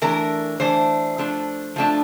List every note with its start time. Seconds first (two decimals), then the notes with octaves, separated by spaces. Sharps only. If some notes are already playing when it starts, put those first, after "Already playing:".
0.02 E3 A3 D4 A#4
0.60 E3 A3 D4 C5
1.18 F3 A3 D4
1.76 F3 A3 D4